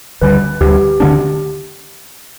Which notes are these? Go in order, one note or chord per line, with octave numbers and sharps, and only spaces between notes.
D2 D3 G3 B4
D2 D3 G3 G4
D2 D3 B3 D4